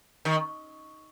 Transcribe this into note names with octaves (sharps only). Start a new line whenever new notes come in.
D#3